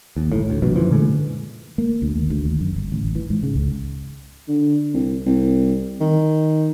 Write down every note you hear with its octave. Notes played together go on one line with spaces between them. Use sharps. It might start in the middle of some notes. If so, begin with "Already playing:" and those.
D#2
G1 A2
D2 A2
A#1 G2 B2
F#2 D3 E3 F3
A#2 D3 G#3 A3
A#3
D2
D#2
D2
D#2
F#2
G1
A1
E3
G#2
C#3
C#2
D3
C2
C2
D#3